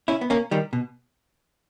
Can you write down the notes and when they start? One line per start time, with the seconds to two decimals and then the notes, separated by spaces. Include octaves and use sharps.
0.08 C#4 E4
0.21 B3
0.30 A#3 C#4
0.51 D#3 G3
0.73 B2